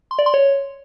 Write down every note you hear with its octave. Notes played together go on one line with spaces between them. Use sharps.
C6
D5
C6
C#5